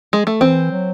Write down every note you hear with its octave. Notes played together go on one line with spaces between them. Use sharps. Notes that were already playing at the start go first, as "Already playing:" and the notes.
G#3
A3
E3 C4
F#3